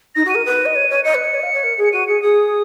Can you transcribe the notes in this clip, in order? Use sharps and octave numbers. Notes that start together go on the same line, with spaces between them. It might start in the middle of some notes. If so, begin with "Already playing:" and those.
D#4 A#6
F#4
D#7
A#4
B4
D#5
C#5
C#5
D#5 C#7
B4
D#5
C#5
D#5
F5
C#5
A#4
G#4
C#7
F#4 D#7
G#4 C#7
G#4 D#6